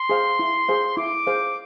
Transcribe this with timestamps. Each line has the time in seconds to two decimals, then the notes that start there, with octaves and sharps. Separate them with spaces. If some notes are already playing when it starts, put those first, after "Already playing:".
Already playing: C6
0.09 G#4 C5 F5
0.39 E4
0.68 G#4 C5 F5
0.97 E4 D6
1.27 G#4 C5 F5